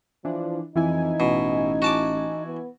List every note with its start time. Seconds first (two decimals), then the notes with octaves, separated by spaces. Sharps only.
0.25 E3 F3 D4
0.76 F2 E3 D#4 E4 G#5
1.20 A1 B2
1.82 F#4 A5 D6
2.46 B3